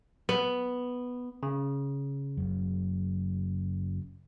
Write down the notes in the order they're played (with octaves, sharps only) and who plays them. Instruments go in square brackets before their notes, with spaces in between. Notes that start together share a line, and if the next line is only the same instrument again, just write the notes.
[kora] B3
[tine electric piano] C#3
[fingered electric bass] F#1 F#2